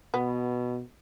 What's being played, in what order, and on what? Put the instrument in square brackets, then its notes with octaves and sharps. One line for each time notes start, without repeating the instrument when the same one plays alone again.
[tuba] B2 [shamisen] B3